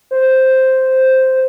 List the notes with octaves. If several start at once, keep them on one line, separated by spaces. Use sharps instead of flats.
C5